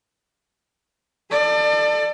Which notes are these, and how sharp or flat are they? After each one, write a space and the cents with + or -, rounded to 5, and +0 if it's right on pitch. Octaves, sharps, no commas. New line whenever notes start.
A4 +20 D5 +30